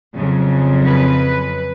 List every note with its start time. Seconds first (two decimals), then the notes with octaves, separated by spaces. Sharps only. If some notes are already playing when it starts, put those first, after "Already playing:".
0.14 F2 C#3 F#3
0.85 B4